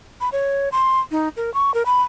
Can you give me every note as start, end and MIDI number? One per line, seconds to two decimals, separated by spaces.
0.21 0.29 83
0.32 0.69 73
0.72 1.00 84
1.11 1.29 63
1.37 1.53 70
1.54 1.74 85
1.74 1.83 70
1.86 2.02 83